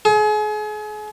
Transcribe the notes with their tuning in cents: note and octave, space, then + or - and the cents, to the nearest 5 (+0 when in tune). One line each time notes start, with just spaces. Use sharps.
G#4 +35